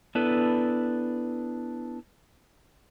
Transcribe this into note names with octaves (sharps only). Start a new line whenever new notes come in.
B3 D4 E4 A4 B4